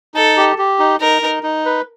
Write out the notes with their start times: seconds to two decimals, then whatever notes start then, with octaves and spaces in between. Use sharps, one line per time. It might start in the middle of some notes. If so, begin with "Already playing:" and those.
0.14 D#4 A4
0.37 G4
0.58 G4
0.79 D#4
1.00 D#4 A#4
1.22 D#4
1.43 D#4
1.65 B4